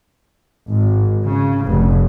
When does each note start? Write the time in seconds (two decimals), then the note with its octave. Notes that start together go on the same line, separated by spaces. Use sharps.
0.68 G#1
1.24 C#3
1.66 F1